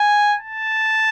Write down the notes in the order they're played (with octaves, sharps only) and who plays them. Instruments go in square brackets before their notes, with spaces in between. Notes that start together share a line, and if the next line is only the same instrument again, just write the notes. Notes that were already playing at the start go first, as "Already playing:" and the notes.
Already playing: [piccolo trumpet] G#5
A5